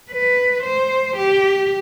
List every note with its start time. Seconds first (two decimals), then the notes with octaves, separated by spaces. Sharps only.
0.11 B4
0.63 C5
1.17 G4